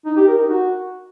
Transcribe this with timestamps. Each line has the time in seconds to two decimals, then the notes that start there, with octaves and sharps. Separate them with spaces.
0.06 D#4
0.17 G4
0.27 A#4
0.38 D#4
0.49 F#4